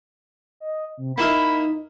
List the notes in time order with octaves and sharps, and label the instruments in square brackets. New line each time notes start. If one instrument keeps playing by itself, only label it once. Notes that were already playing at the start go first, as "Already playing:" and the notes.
[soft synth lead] D#5
C3
[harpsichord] A#3 E4 A#4 [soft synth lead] D#4 [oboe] B5